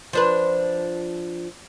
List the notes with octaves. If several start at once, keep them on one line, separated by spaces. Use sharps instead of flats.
F3 D4 B4